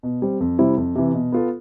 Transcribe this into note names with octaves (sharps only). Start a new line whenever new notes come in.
B2
G3 C4
F2
C3 G3 C4 E4
F2
C3 E3
B2
B3 F4 A4